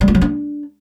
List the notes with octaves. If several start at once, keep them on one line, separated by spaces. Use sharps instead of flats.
G3
F4
F#3
D4